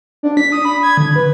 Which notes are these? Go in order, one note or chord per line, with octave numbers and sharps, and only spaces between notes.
D4
B6
D#6
B5
G#6
D3
B4